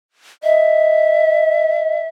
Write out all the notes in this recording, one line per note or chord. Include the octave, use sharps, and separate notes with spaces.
D#5 E5